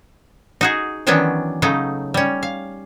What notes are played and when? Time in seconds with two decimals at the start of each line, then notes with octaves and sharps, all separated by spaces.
0.61 D#4 F#4 G#4
1.07 D#3 E3 F#3 B3 C#4 D4
1.62 C#3 F#3 A3 D#4
2.14 G3 C#4
2.43 F5